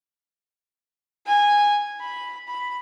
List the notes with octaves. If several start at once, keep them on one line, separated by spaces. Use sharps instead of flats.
G#5
B5
B5